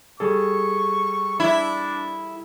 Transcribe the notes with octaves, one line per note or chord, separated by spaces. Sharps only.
G3 G#4 A4 C#6
D4 E4